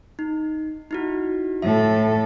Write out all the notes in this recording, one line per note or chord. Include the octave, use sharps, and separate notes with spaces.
D#4
D#4 E4 F#4
A2 A4 E5